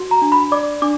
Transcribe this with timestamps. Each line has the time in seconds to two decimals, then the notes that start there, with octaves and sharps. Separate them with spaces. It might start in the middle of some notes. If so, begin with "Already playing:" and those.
Already playing: F#4
0.11 A#5
0.22 D4
0.32 B5
0.52 D5 D6
0.82 D4 D6